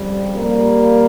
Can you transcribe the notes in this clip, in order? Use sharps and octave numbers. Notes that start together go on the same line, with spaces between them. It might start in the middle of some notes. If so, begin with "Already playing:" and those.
Already playing: F2 C#3 G3
G3 A#3